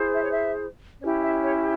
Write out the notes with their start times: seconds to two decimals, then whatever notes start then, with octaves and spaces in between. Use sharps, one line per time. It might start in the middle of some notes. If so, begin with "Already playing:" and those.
Already playing: E4 G#4 C5
0.14 E5
0.22 C#5
0.30 E5
1.01 C#4 E4 G4 C#5
1.23 E5
1.44 C#5